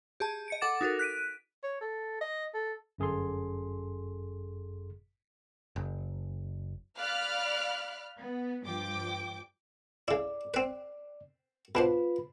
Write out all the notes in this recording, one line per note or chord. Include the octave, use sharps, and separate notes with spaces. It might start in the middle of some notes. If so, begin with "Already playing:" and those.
G4 G#4 A5
D#5 C#7 D7
A4 F#5 D6 A6 E7
D#4 F#4 A4 A#4
F#6 B6 D7 D#7
C#5
A4
D#5
A4
G1 F#2 G#4 A4 C6
F#1
D5 F5 B5 F6 F#6
B3
G2 F3 G5 D6
C#3 E4 D5
C4 B4
B2 D4 F4 B4 C5 B5